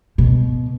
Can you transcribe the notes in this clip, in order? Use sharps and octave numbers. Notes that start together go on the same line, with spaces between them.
B2